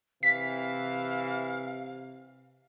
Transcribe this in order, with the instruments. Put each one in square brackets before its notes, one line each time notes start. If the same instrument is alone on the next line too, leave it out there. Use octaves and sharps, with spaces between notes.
[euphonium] C3 [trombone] E3 [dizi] F5 [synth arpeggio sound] B6